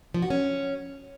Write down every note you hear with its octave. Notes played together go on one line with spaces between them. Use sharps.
F3
F#4
C#4